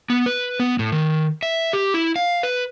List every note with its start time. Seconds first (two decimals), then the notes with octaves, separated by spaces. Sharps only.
0.10 B3
0.26 B4
0.60 B3
0.79 A2
0.92 D#3
1.43 E5
1.73 G4
1.94 E4
2.16 F5
2.43 B4